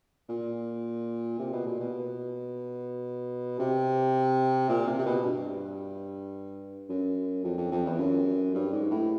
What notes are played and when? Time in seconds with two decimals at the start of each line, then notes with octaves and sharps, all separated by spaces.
0.29 A#2
1.39 C3
1.52 B2
1.66 A#2
1.80 B2
3.59 C3
4.69 A#2
4.87 C3
4.99 C3
5.06 B2
5.24 G2
6.89 F#2
7.44 F2
7.57 F2
7.72 F2
7.86 E2
7.99 F#2
8.55 G2
8.73 G#2
8.91 A2